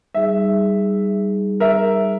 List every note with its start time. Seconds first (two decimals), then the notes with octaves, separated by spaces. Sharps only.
0.14 G3 D#4 G#4 E5
1.60 A#4 E5